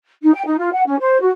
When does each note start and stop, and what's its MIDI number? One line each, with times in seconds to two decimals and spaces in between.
0.23 0.32 63
0.34 0.42 79
0.46 0.57 63
0.58 0.72 65
0.73 0.83 78
0.87 0.96 61
1.00 1.19 72
1.21 1.31 66